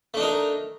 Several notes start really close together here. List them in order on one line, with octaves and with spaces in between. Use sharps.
A3 D4 D#4 A#4